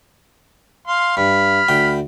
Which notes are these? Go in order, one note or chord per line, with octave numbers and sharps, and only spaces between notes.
F5 C6
G2 B5 F6
D2 G5